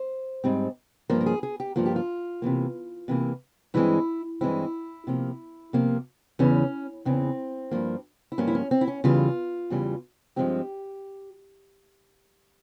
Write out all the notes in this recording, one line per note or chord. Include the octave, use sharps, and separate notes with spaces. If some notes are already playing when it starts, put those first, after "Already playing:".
Already playing: C5
G#2 G3 C4
G2 F3 A#3 A#4
A#4
G#4
G#4
G4
G2 F3 A#3 F4
G4
F4
C3 E3 A#3
C3 E3 A#3
G2 E3 G#3 C4 E4
G2 E3 G#3 C4 E4
C3 F3 A#3
C3 F3 A#3
E2 C#3 E3 C#4
E2 C#3 E3 C4
G2 F3 A#3
E4
G2 F3 A#3 C#4
E4
C#4
C4
E4
C#4
E2 C#3 E3 G3 F4
E2 C#3 E3 G3
G2 F3 G#3 C4 G4